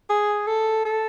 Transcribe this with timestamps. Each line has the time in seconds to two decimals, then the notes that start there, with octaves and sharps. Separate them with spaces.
0.10 G#4
0.47 A4
0.85 A4